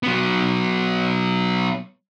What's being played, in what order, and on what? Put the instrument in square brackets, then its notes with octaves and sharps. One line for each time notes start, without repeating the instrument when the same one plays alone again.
[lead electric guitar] F#3 B3